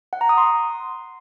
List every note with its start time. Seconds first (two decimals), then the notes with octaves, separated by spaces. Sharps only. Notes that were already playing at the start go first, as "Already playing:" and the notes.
0.13 F#5
0.21 A#5
0.29 D#6
0.38 C6